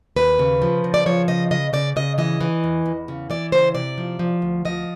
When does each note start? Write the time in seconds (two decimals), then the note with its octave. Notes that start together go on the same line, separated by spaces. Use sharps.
0.16 D#2 B4
0.39 C#3
0.62 F3
0.84 C#3
0.94 D5
1.06 F3 C#5
1.28 C#3 D#5
1.51 C#3 D#5
1.73 C#3 D5
1.96 C#3 D#5
2.18 E3 D#5
2.41 E3
2.64 E2
2.86 E2
3.08 C#3
3.30 E3 D5
3.52 C#3 C5
3.75 C3 D5
3.98 F3
4.19 F3
4.42 D2
4.65 F3 D#5